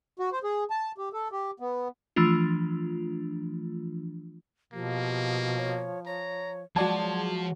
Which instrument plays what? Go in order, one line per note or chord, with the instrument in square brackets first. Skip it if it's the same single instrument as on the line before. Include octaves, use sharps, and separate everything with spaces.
[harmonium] F#4
C5
G#4
A5
G4
A4
G4
B3
[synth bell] E3 F3 A3 D4 F4
[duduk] B2 [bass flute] F3 [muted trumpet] A#3 [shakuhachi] G4
[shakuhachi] C#5
[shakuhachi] C#5 [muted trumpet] A#5
[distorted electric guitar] F3 [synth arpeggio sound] F#3 G#3 F#4 [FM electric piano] D5 G#6 [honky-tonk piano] A5